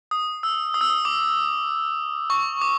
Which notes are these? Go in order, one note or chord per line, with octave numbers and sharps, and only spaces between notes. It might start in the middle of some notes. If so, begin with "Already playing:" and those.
D#6
E6
D#6
E6
D#6
D6
C#6
D6